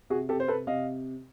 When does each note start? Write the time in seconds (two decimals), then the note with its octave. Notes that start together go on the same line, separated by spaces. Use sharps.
0.10 C3 F#4 G#4
0.29 C3 G4 A4
0.40 C5
0.48 C3 A4 B4
0.67 C3 D#5 F5